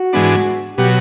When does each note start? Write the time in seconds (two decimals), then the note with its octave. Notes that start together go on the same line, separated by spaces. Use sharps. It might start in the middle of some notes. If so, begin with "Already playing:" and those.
Already playing: F#4
0.13 G#2 E3 G#3 B3 D4
0.77 B2 F#3 G4